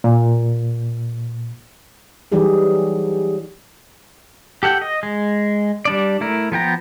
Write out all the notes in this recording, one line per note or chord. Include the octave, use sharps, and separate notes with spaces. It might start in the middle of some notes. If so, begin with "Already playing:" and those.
A#2
E3 F#3 G3 D#4 G4 G#4
G4 A4 F#5 G5
D#5
G#3
G3 D4 D5
A3 E4 A#4
F3 B3 G5 A#5